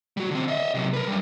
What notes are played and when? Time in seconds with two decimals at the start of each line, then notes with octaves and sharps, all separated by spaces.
0.17 G3 F#4
0.31 D3 C4
0.48 D#5 E5
0.74 C3 F#3
0.94 A#4 B4
1.07 F#2 G3